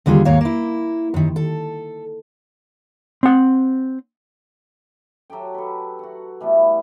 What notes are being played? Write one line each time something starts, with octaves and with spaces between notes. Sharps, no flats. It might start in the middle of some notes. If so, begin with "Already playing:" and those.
D#2 D3 G3 F4 G#4
D#2 G#2 A#3 C#5 F5
A#3 E4
F#2 D#3
A4
C4 F#5
F#3 G4 A4 G5
A4 B4
F#4 F#5
E3 G3 A3 B3